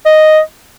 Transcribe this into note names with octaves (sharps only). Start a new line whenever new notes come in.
D#5